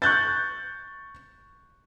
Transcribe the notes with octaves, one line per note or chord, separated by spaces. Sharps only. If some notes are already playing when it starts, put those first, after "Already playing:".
C#6 F#6 G6 A6